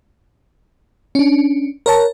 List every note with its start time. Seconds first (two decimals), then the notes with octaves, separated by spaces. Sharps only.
1.15 C#4 D4
1.86 A#4 C#5 A5